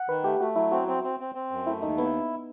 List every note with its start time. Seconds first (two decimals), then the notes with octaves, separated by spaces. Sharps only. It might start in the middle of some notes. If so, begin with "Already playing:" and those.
Already playing: F#5
0.09 D#3 B4
0.24 A3 G4
0.40 A3 F#4
0.56 F#3 E4
0.72 C4 F#4
0.88 C4 F#4
1.04 C4
1.20 C4
1.35 C4
1.51 F#2
1.66 A3 E4
1.82 D#2 D#4
1.98 B3 E4